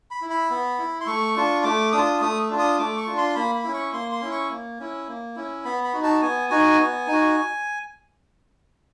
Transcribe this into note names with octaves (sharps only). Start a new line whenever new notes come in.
B5
E4
B5
B3
E4
C6
A3 C#6
D4 F4
A3 D6
D4 F4 D#6
A3 D#6
D4 F4
D#6
A3 D6
C#6
D4 F4
C6
A#3 B5
B5
C#4 E4
C#6
A#3 C6
C6
C#4 E4
C#6
A#3
C#4 E4
A#3
C#4 E4
B3 B5
B5
D#4 F#4
A5
B3 G#5
D#4 F#4 G#5
B3
D#4
F#4